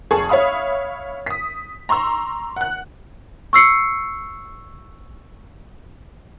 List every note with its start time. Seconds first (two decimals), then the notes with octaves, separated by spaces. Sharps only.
0.11 F1 G#4 A4 A5 C#6
0.29 C#5 E5 F5 B5 D#6
1.26 D#6 B6
1.89 A#5 C6 C#6 E6
2.56 F#5 F#6
3.53 C#6 E6 C7 C#7